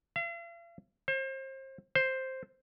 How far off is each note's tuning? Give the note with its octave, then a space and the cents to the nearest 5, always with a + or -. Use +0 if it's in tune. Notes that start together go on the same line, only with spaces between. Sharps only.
F5 -45
C5 +35
C5 +5